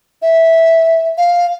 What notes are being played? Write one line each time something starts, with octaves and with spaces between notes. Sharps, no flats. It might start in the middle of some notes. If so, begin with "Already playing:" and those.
E5
F5